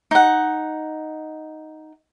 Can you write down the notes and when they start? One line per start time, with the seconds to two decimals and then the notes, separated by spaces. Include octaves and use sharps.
0.11 D#4 F#5